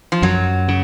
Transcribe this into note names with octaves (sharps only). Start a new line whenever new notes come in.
F3
F#2 F#3
C#3